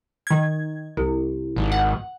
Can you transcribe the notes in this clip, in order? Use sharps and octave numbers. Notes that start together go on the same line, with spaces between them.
D#3 G#6
C2
G#1
F#5